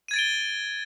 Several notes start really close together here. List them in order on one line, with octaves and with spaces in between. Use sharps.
D#7 G#6 A6 D7 G7